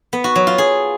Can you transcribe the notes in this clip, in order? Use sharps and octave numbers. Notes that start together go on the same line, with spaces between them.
B3
F#4
F#3
F4
G#4